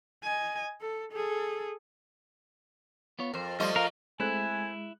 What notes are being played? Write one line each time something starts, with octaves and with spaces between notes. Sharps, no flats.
D#5 G#5
A4
G#4 A4
B3 F4 C#5
F2 A#4 C5
F3 G3 A3 D#5 C6
F4 A#4 F5
G#3 A3 C4 E4 G#5 F#6